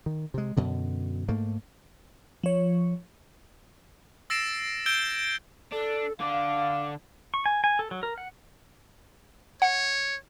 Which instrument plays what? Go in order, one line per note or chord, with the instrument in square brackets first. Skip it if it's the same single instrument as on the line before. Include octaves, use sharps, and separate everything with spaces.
[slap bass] D#3
C3 G#3
F#2 B2 D3
G#2 A3 A#3
[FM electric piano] F3 C#5
[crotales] E6 A6 A#6 C7 D7 E7
E6 G6 G#6 D7 G7
[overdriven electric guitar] D4 [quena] A4
[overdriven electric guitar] D3 D4 [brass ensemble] F5 [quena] D6
[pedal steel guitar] C#6
G#5
G#5
A4
F#3
A#4
F#5
[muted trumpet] C#5 [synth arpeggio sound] F#5